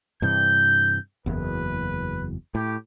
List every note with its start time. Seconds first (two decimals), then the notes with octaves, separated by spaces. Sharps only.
0.22 G2 C3 E3 G6
1.26 F#1 E2 B4
2.55 A2 G4